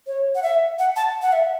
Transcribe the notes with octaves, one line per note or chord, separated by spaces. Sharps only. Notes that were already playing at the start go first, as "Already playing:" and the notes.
C#5
F#5
E5
F#5
A5
F#5
E5